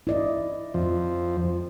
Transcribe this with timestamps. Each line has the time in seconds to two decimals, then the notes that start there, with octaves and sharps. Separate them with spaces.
0.07 E4 D5 D#5
0.74 F2 F3